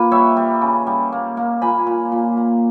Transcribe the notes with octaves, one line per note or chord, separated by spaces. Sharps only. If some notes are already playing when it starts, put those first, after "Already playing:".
Already playing: A#2 A#3 B4
G3 C#5 E5
G3
C#3
G3
A#3
A#3
A#2 G#5 B5
A#2
A#2
A#3